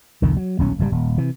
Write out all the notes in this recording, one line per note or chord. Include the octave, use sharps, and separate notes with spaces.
B1 E2 D3 D#3
F#3
D#1 B1 C#4
F#1 G#2 B2 G3
D#1
C3 E3